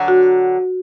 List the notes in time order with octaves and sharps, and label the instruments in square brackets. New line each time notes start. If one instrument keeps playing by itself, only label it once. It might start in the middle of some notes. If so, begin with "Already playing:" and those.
Already playing: [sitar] D3 F#3
[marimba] F#4